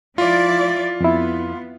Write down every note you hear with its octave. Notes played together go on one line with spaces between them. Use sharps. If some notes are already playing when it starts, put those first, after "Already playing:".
F3 E4 F4 D5
F2 B3 E4